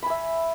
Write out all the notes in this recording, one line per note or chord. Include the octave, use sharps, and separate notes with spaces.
E5 G#5 B5